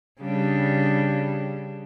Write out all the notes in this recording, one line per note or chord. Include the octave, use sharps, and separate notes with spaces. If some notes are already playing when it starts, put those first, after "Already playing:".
C#3 G3 D4